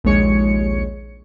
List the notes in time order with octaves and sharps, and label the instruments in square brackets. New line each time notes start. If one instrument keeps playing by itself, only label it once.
[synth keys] A#1 D#2 G#3 C#5 C#7